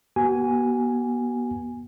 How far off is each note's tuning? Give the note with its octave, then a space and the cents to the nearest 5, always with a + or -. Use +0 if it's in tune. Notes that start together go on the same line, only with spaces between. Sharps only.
B3 -35 F#4 +40 G#5 +0